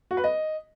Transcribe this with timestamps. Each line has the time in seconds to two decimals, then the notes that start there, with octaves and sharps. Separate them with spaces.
0.11 F#4
0.17 B4
0.24 D#5